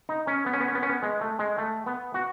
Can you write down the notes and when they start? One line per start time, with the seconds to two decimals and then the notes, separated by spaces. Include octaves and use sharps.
0.09 D#4
0.27 C#4
0.46 B3
0.53 C#4
0.61 B3
0.68 C#4
0.75 B3
0.83 C#4
0.89 B3
1.03 G#3
1.21 A3
1.39 G#3
1.58 A3
1.86 B3
2.14 F#4